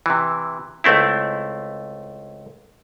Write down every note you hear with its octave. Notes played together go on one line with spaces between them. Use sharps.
C3 E3
C#2 A3 C4 E4